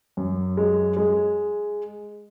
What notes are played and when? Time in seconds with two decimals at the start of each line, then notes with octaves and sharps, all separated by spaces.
0.17 F#2
0.57 G#3
0.97 G#3